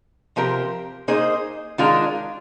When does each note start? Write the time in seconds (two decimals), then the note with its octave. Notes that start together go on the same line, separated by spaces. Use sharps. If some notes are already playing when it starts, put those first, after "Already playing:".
0.36 C3 F3 C4 G4 A#4
1.08 A#3 D#4 G#4 C5 D#5
1.78 D#3 G#3 D4 F4 A#4